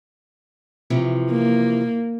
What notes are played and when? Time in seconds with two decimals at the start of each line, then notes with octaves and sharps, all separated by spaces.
0.90 C3 E3 F3
1.31 A#3